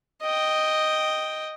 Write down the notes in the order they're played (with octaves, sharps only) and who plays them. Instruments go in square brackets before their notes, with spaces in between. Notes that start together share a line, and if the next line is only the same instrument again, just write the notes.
[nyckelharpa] D#5 G5